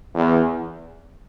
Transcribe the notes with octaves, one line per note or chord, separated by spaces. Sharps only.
E2